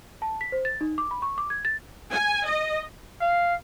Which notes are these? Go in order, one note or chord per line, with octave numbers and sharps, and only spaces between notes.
A5
B6
C5
A6
D#4
D6
B5
C#6
D6
G#6
A6
G#5
D#5
F5